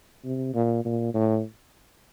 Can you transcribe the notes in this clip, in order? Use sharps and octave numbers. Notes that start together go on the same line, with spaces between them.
C3
A#2
A#2
A2